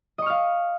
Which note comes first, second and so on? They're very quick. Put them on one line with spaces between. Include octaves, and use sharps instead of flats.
D#5 C#6 F6 F5